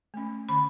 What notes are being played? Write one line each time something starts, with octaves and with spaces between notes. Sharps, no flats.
A3 C#4
D3 B5